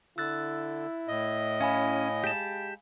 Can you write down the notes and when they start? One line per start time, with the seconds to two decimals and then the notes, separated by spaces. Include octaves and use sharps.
0.18 D3 E4 E6 F#6 A6
1.08 A2 D#5
1.61 C#4 F5 G#5 B5
2.24 G#3 G4 A5